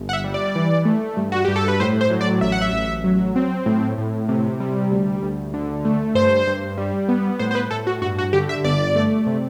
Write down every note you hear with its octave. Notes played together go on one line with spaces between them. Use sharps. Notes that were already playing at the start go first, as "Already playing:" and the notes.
Already playing: G1
F#5
E5
G3
D5
E3
A3
G2
F#4
G2 G4
A4
B4
A2 C5
C5
F#3
D5
A1 E5
F#5
E5
A1
F#3
C4
A2
A2
C3
G3
D2
D2
D3
A3
G2 C5
G2
G3
B3
A2 C5
C5
B4
A2 A4
F#4
G2 F#4
F#4
D3 G4
E5
G1 D5
A3
C3